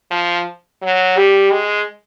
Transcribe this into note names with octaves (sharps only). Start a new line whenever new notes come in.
F3
F#3
G3 G4
G#3